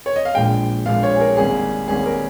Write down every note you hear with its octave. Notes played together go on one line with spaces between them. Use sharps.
C#5
D#5
F5
A#1 A#2 G#3 G5
A#1 A#2 G#3 F5
C#5
G#4
A#4
G#1 G#2 G3 A#3 C#4 G#4
G#1 G#2 G3 A#3 C#4 G#4
A#4